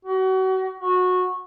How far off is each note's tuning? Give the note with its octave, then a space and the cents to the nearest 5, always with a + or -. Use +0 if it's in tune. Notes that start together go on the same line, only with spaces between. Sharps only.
F#4 +35
F#4 -20